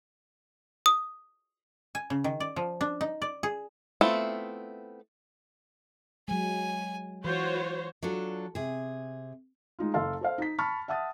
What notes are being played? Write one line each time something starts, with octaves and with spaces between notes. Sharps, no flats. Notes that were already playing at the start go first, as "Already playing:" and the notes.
D#6
G#5
C#3
D#3
D5
F3
D4
D#4
D5
G#4
A3 B3 C4 E4 F4
F#3 G#3 G#5
E3 F4 F#4 C5 C#5
F#3 D4 F4 A4
C3 G#4
G#3 D#4 F4
F#1 A4 F5 C6
A4 C5 F5
D#4 B6
A5 B5 C#6 F6 A6
E5 F#5 A5 D#6 A6